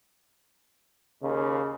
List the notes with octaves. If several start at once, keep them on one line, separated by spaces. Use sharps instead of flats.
D#2 C#3